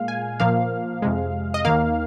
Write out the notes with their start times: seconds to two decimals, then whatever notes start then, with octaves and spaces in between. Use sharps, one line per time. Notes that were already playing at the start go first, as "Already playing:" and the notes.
Already playing: A#2 G#3 F5
0.08 G#5
0.40 A#2 F3 A#3 F5
1.02 F2 C3 G#3
1.54 D#5
1.65 D#2 D#3 A#3 F5